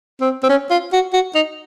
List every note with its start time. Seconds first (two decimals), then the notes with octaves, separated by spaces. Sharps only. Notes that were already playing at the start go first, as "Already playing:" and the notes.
0.21 C4
0.43 C4
0.49 C#4
0.71 F4
0.93 F#4
1.13 F#4
1.35 D#4